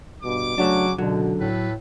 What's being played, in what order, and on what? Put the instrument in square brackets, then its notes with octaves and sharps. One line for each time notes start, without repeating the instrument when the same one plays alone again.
[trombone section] G2 B2 [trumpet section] D6
[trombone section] C#3 C#4 F#4 [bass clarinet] F#3 [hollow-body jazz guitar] A3 D4
[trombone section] C#2 D3 [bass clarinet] B2 [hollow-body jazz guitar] F#3
[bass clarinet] A2 [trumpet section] A4 B4